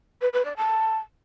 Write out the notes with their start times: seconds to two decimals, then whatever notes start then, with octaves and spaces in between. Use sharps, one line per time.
0.22 B4
0.33 B4
0.45 D5
0.57 A5